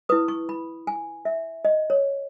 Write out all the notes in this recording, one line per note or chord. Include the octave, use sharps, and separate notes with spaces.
E4 B4 D#6
C#6
B5
G#5
E5
D#5
C#5